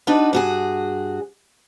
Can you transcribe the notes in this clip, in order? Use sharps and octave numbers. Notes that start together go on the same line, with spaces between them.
D4 D#4 F#4 B4
G2 F#4 G#4